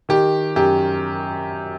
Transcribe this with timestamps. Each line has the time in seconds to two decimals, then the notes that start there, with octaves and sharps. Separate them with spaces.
0.09 D#3 G4
0.56 F#2 G4